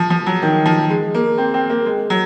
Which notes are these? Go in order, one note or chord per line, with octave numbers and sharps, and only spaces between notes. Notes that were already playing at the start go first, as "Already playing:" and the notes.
Already playing: F3
F3
F#3
D#3
F3
G#3
A#3
C4
C4
A#3
G#3
F#3